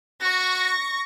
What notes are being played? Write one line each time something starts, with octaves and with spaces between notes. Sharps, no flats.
F#4 C#6 A#6